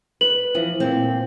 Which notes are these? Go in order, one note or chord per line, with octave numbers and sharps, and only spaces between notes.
B4 F#7
E3 F3
A#2 C4